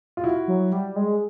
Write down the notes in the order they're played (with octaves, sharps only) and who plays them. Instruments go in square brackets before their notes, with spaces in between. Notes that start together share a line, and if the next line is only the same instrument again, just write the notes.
[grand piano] F4
E4 F#4
[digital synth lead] F#3
G3
G#3